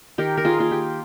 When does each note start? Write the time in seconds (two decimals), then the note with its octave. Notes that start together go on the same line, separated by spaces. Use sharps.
0.18 D#3 G4 A#4
0.37 A#4
0.45 F4 G#4
0.58 A#3 F4
0.71 G4